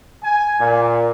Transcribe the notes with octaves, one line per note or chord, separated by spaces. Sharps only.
G#5
A#2